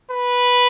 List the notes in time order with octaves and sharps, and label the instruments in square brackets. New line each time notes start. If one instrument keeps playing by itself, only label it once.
[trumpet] B4